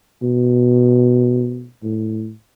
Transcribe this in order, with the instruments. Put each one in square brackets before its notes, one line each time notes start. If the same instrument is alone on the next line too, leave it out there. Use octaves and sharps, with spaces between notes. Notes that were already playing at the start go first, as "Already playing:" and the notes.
[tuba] B2
A2